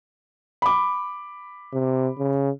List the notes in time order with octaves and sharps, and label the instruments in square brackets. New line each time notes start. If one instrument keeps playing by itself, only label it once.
[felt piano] B5 D6
[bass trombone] C3
C#3